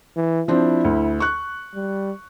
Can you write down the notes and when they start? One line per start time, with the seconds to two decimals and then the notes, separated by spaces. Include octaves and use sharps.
0.17 E3
0.48 F3 C4 D4 E4
0.84 D2
1.20 C#6 F#6
1.75 G3